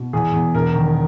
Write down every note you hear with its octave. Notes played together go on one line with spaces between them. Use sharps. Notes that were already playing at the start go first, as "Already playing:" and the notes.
Already playing: B2
E2 G#4
E2
E1 A#4
D#3